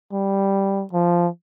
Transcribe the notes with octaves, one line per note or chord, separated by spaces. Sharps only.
G3
F3